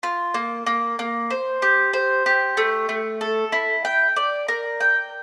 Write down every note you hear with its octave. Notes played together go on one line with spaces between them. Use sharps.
F4
A#3
A#3
A#3
C5
G4
C5
G4
A3
A3
A4
E4
G5
D5
A#4
G5